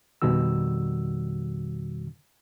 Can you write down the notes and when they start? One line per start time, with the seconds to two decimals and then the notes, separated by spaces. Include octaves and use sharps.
0.22 F2 B2 D#3 G3 F#4 E6